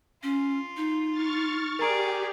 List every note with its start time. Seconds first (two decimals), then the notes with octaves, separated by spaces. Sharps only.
0.23 C#4 F4
0.77 D#4
1.10 C#6 F6 A6
1.79 G4 G#4 A#4 D5 A#5 D7